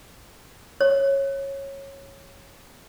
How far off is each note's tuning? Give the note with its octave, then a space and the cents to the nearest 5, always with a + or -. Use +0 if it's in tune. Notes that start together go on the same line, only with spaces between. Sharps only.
C#5 -15